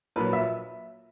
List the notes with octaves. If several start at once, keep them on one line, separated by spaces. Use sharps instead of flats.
A#1 A#2 F#3 B4
E5